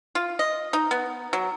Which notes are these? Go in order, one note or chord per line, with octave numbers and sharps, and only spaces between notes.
F4
D#5
D#4
B3
F#3